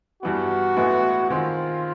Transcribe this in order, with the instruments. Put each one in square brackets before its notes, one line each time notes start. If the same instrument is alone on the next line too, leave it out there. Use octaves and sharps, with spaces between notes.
[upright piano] G2 E3 G3 B3 [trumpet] F#4
[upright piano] A2 E3 G#3 B3 E4
[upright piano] D#3 G#3 C4 [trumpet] F4